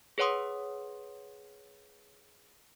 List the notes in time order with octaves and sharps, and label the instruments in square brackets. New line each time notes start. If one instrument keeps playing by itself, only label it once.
[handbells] G#4 B4 C#5 F#5 C6 D#6